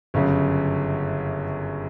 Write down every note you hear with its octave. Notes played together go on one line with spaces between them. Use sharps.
G1 F#2 C#3